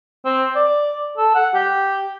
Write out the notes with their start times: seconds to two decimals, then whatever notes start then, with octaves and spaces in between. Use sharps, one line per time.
0.25 C4
0.55 D5
1.17 A4
1.35 F#5
1.54 G4